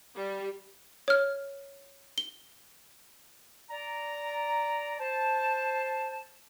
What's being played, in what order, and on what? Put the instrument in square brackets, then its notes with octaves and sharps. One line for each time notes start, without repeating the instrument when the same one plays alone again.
[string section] G3
[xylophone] C#5 F6
G7
[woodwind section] D5 A#5
C5 A5